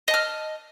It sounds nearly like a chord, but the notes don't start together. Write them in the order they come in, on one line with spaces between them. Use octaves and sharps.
D#5 A5 F6